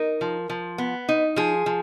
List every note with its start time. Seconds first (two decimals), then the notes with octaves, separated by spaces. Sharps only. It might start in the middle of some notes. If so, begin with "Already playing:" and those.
Already playing: D#4 A#4
0.21 F3
0.50 F3
0.78 B3
1.09 D#4
1.36 F3 G#4
1.66 F3